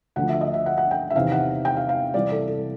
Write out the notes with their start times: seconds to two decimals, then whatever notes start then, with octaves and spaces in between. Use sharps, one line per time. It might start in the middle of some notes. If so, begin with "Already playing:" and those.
0.16 D2 D3 F3 F#5
0.29 E5
0.41 D#5
0.54 E5
0.66 F#5
0.78 F#5
0.91 G5
1.10 E5
1.14 E2 C3 D#3 F5
1.32 F#5
1.65 G5
1.77 F5
1.89 F5
2.14 C2 C3 E3 D5
2.30 A4
2.48 A4